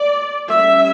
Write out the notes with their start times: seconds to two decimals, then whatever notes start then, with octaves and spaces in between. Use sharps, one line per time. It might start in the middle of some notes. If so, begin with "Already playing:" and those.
Already playing: D5
0.49 G3 C#4 E5